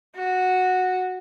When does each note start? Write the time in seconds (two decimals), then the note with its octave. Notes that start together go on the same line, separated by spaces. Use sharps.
0.15 F#4